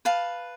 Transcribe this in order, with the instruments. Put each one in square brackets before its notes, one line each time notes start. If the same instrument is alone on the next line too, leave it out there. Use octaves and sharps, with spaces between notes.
[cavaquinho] B4 F5 A5